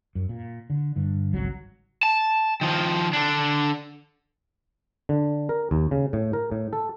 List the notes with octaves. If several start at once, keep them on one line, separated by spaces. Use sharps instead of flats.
F#2
A#2
D3
G2 D3
G#1 C#2 F#3
A5
D#3 F3
D3 D4
D3
A#4
D#2
C#3
A2
A#4
A2
A4